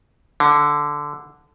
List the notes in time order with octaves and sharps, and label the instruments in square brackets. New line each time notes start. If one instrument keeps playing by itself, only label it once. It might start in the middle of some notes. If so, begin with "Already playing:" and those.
[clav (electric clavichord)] D3